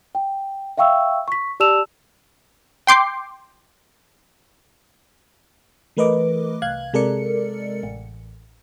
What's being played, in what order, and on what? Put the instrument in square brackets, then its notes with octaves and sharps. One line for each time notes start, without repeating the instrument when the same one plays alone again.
[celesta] G5
E5 F5 G5 C#6 E6
C#6 B6
G4 D5 A5 E6 E7 F7
[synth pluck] G5 C6 D6 G6 C7
[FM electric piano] E3 A3 A#4 B4 D#5 D6
C2 F5 F#6 G#6
C3 G#3 A4 A#4 D5 C#7
A1